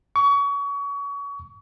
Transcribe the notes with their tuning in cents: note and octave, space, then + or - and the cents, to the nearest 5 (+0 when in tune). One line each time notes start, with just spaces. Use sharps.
C#6 +30